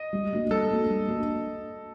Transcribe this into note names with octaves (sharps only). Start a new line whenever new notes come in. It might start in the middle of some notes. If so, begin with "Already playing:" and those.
Already playing: D#5
G3
A#3 D4 F#4
G3 A4
A#3 D4 F#4
G3
A#3 D4 F#4